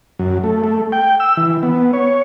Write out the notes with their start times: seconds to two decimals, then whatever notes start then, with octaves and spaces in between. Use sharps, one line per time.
0.19 F#2
0.44 A3
0.64 A3
0.92 G5
1.20 E6
1.37 E3
1.63 B3
1.93 C#5